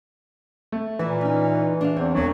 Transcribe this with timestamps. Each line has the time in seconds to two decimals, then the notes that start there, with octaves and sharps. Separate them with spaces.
0.72 A3
0.99 A#2 E3 E4 E5 G#5
1.21 C#4 D#4
1.81 D4 G#4 F5
1.97 E2 C4 C#5
2.15 E1 F#3 D4